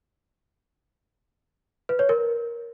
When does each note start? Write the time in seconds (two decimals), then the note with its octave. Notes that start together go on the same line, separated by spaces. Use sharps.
1.89 B4
1.99 C#5
2.09 A#4